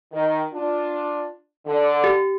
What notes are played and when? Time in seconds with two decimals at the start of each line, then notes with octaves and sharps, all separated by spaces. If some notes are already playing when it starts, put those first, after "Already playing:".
0.13 D#3
0.53 D4 F4
1.67 D3
2.04 G4